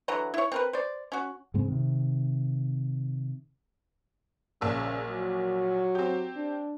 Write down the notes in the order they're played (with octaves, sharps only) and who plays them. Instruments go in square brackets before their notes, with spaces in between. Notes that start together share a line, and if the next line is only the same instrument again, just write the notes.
[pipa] D3 E3 F#3 A#5
E4 C#5
C4 A#4 B4
C5 D5
C#4 F#4
[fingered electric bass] G#2 C#3 G#3 C4
C3 D#3
[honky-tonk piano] A#1 A#2 E6 [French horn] C#3
[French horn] F#3
[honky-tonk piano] C4 G4
[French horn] D4